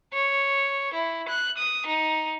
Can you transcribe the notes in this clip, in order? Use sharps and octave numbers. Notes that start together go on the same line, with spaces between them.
C#5
E4
F#6
D#6
D#4